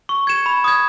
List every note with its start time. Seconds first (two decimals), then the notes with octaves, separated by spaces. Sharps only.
0.09 C#6
0.27 G#6 C#7 E7
0.46 B5
0.64 D#6 G#6